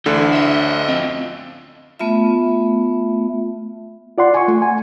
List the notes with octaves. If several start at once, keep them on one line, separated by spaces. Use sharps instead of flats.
D2 D3 E3
D#5 E5
F3 C4
A3 B3 F4 E5
F4 D5 F#5 C6
G#5 C#6
A3
G#5